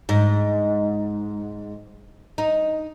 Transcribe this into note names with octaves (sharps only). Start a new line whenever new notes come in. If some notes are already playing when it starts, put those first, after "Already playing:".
G#2
D#4